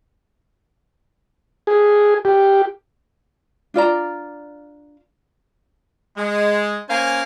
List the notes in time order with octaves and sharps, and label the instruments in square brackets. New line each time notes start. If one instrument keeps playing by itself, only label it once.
[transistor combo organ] G#4
G4
[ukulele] D4 F4 D5 A#5
[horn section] G#3
A#3 C#4 C5 F5 G#5